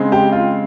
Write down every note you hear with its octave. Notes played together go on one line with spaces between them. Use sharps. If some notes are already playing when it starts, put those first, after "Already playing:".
Already playing: C#3 G#3 C4
G4
F4